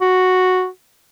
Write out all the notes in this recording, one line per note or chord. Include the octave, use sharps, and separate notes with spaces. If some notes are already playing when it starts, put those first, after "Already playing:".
F#4